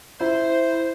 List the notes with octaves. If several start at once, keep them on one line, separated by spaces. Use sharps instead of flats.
E4 C5